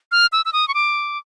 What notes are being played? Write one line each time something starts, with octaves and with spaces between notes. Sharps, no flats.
F6
E6
E6
D#6
C#6
D6